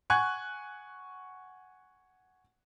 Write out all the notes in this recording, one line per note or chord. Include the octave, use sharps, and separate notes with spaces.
F#5 G#5 C#6 F#6 G#6